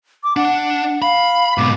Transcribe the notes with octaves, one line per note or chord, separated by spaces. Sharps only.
D6
D4 F#5
F5 B5
G#2 B2 D6